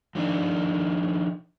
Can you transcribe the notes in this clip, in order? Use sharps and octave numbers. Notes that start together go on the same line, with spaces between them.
F3 D4 D#4